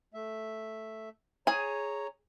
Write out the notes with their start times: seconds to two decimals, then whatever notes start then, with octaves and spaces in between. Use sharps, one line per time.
0.14 A3 E5
1.47 G#4 C#5 G#5 A#5